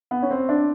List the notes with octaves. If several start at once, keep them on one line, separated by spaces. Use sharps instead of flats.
B3
C#4
C4
D4